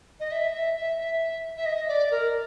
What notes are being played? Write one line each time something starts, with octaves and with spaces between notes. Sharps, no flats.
D#5
E5
E5
E5
E5
E5
D#5
D5
A#4